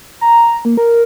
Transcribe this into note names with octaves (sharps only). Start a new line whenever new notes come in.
A#5
A#3
A#4